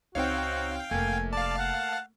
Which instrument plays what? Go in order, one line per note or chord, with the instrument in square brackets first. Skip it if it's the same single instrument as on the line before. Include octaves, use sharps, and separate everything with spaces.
[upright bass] C#2 [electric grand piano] C4 D#4 C#5 [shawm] F#4 [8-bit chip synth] F5 G5
[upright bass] F1 [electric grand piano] A3 A#3 [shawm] G#5
[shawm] D5 [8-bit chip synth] F5 A5
[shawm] F#5